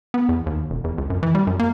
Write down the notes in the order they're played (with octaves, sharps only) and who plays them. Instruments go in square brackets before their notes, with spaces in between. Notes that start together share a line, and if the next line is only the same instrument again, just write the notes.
[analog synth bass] B3
E2
D#2
E1
E2
C#2
F#2
E3
G3
F#2
A#3